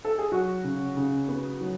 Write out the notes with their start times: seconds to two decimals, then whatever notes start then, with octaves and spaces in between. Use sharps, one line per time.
0.05 A4
0.18 G#4
0.32 F#3 F#4
0.64 C#3
0.97 C#3
1.28 B3
1.61 F#3